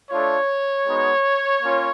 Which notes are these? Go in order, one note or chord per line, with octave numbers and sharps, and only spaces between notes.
A3 D4 F4 C#5
G#3 B3 D#4 F#4
A#3 C#4 F4